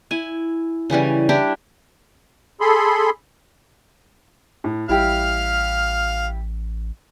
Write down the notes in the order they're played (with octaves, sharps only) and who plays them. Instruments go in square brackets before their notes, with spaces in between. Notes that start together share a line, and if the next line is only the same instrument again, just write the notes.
[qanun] E4 G#5
C#3 E3 G3 C#4
D4 E4 G4
[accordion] G#4 A4 B5 C6
[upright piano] A2
[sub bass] A1 [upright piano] G3 E4 G4 [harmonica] F5 F6